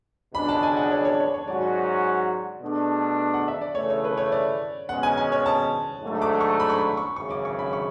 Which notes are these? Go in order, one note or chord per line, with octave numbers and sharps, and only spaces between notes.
C#2 B2 G#3 D4 B5
A5
G#5
F#5
C#5
C#5
C#5
C#5
G#2 F#3 C#4 F#4 D5
B2 A3 D4 G#4
F#5
E5
D5
C#3 E3 A3 C#5
C#5
B4
C#5
D5
B2 G#3 C#4 F#5
G#5
G#5
C#5
A5
G#2 F#3 A3 D4
D6
C#6
B5
C#6
B5
C#6
G#1 F#2 C#3 C#6
D6
C#6
B5
C#6